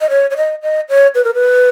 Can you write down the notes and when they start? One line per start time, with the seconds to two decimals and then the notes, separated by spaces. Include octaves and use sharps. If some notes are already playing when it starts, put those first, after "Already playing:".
0.01 D#5
0.10 C#5
0.30 C#5
0.37 D#5
0.62 D#5
0.89 C#5
1.15 B4
1.24 A#4
1.34 B4